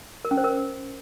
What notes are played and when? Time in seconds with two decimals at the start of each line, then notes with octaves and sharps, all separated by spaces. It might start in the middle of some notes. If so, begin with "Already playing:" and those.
0.25 A#4
0.31 C#4
0.37 C5
0.44 A#4